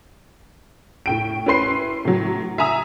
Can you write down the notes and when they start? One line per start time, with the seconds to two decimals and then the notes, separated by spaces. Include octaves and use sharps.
1.06 A2 G5 D7
1.46 C#4 E4 B4 C6 C7
2.05 A2 F#3
2.58 E5 G#5 A#5 D#6 E6